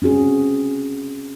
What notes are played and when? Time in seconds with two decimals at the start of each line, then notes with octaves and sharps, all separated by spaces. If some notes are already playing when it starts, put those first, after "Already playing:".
0.02 C4 C#4 F#4 G#4